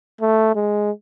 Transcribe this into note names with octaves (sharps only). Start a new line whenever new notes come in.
A3
G#3